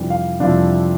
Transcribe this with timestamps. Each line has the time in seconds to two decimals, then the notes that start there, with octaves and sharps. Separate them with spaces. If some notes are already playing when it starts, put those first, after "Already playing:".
Already playing: F2 C3 E3 G3 D4
0.10 F5
0.40 F2 C3 E3 G3 D4 F5